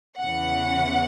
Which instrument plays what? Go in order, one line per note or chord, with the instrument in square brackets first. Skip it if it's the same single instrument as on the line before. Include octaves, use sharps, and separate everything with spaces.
[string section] E2 C#3 E3 F#5